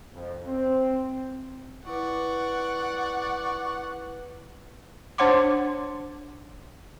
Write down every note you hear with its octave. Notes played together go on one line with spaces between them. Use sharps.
F2
C4
E4 B4 D5 F#5 C#6
D4 C5 C#5 F#5 C6 D6